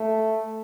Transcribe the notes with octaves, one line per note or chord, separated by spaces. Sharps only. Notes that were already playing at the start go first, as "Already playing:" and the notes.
Already playing: A3